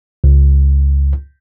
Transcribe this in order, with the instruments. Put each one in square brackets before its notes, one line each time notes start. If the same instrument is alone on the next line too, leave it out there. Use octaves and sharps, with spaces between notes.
[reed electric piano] C#2